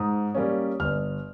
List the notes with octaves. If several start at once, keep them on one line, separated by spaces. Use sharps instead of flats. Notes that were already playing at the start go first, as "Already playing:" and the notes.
Already playing: G#2 D#6
G3 A#3 C#4
G1 F6